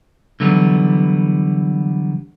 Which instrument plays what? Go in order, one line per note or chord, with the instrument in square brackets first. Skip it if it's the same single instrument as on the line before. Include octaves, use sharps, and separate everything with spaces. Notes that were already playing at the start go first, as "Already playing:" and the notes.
[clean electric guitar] D3 E3 F#3 G3 B3